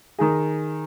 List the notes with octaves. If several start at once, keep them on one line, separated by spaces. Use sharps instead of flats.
D#3 D#4 G#4